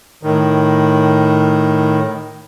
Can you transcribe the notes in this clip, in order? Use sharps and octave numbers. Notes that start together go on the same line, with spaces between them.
A2 D#3